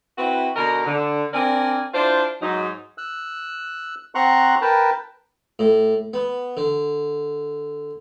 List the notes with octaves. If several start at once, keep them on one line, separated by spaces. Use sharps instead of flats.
C4 E4 F#4 B4
B2 D3 A#4 D#5 A#5
D3
C4 D4 A#4 D5 G#5
D4 E4 F4 C5
G#2 F#3 D#4
E6 F#6
C4 F#5 A#5 C6 C#6 F#6
A#4 B4 G5 A5
A2
B3
D3